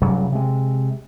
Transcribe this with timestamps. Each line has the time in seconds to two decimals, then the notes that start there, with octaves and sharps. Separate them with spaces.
0.02 F1 C#3 F#3 G3
0.32 C3 G#3